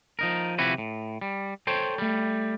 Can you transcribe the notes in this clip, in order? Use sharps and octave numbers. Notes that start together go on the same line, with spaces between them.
F3 D#4 A#4
C3 F3 E4 F#4 G4 B4
A2
G3
A4 C5 C#5 G5
G3 A3